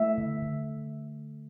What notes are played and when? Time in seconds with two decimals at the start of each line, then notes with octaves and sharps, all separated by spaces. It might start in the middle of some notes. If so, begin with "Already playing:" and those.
Already playing: A3 E5
0.18 D3
0.42 D3